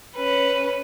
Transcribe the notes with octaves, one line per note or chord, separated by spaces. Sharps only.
C#4 B4